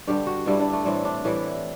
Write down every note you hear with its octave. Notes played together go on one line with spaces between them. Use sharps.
G2 D3 G3 G4
F#4
G2 D3 G3 E4
D4
A3
A2 E3 G3 C4
D4
A2 E3 G3 E4